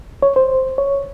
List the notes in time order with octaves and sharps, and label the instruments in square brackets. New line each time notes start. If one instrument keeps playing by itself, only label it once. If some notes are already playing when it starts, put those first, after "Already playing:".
[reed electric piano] C#5
C5
C#5